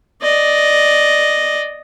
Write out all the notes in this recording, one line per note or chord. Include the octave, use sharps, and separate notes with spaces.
D5 D#5